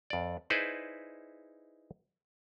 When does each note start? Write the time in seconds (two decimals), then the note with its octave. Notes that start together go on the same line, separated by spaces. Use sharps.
0.10 F2 D5
0.50 D#4 E4 G#4 B4 C5 D5